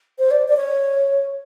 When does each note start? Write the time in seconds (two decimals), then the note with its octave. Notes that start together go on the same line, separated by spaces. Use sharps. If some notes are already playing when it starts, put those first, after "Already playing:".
0.19 C5
0.31 D5
0.48 D5
0.57 C#5